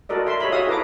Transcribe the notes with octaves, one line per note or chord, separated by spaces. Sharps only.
F#4 A4 A#4 D5 D#5
E5 A5 C6
G4 C#5 D#5 E5 B5
F#4 G#4 C#5 E5 F5 D#6
E4 A4 B4 A#5 D6